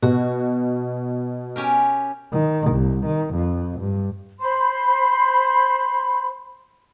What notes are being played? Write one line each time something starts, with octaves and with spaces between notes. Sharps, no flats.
B2 F#4
C#4 G4 A#4
D#3
C2
D#3
F2
G2
C5 B5 C6